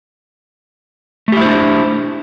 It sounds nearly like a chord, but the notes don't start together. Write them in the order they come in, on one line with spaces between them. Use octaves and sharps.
A3 G4 E4 C5 D4